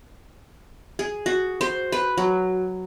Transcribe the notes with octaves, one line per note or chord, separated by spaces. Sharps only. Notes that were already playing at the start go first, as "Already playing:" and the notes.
G#4
F#4
C5
B4
F#3